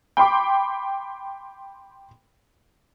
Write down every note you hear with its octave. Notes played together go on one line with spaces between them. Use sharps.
G5 B5 C6 D6